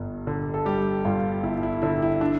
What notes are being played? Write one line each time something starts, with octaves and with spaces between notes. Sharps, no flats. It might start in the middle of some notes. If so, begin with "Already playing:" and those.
Already playing: G1 G2
D3
A4
G3 G4
G2 F4
G1 E4
E4
D3 E4
E4
D4